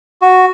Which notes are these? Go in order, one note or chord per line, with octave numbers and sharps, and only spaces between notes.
F#4